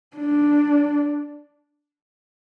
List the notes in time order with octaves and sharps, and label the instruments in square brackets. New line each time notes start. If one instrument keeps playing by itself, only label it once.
[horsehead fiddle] D4